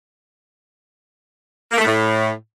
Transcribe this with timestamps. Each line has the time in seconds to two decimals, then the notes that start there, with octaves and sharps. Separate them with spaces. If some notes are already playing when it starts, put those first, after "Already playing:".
1.71 A#3
1.77 A3
1.84 A2